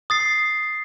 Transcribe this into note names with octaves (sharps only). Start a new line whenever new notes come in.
D#6 A6 C7